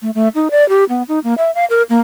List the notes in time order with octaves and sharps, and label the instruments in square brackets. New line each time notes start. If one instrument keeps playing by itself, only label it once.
[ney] A3
A3
D#4
D5
G4
B3
D#4
A#3
E5
F5
A#4
A#3